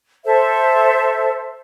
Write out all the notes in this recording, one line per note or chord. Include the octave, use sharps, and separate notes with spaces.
A4 C5 E5